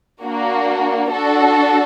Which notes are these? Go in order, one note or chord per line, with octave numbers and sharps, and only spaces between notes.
A#3 D4 F#4
D4 F#4 A4